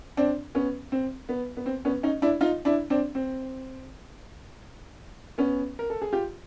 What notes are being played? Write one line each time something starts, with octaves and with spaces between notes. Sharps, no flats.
C4 D4
B3 C#4
C4
B3
B3
C4
B3 C#4
C#4 D#4
D4 E4
D#4 F4
D4 E4
C4 D4
C4
B3 C#4
A#4
A4
G#4
F4 G4